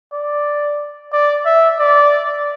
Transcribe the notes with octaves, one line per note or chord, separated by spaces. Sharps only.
D5
D5
E5
D5